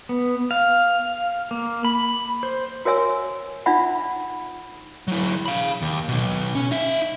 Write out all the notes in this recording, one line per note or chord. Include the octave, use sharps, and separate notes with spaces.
B3
F5
A#3
B5
C5
F#4 A#4 C#5 E5 G#5 E6
D4 D#4 F4 E5 F#5 B5
F#3 E4
F5 B5
D#2
B2 F#3
C#4
D#4 E5